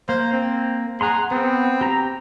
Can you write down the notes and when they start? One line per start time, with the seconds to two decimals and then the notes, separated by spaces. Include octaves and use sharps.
0.09 A#3 C5
0.32 C4
1.01 G#4 F#5 A#5 C6
1.31 B3 C4
1.81 G4 A#5